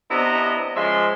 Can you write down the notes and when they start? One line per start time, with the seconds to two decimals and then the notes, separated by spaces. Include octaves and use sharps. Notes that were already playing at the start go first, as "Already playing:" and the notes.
0.11 C3 B3 D4 E4 D#5 A#5
0.76 C#3 F3 G#3 E5 C6